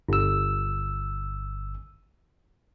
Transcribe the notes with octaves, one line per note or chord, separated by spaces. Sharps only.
G1 E6